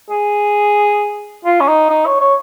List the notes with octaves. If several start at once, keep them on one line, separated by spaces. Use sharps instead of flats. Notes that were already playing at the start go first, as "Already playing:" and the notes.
G#4
F4
C#4
D#4
D#4
C#5
C#5